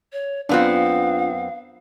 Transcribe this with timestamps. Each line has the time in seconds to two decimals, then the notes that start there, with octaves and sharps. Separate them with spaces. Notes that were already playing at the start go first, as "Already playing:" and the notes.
0.13 C#5
0.49 F#2 B3 C4 D4 F4 F5